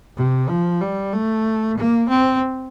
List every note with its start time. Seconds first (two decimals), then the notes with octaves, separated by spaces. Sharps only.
0.17 C3
0.49 F3
0.81 G3
1.13 A3
1.77 A#3
2.09 C4